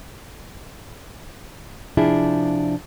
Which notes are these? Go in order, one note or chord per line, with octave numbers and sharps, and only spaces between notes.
C3 F3 D4 E4 F4 G#4